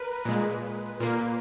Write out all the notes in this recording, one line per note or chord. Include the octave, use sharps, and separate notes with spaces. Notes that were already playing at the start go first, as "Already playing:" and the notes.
Already playing: A#4 B4
A#2 G#3
A#2 A#3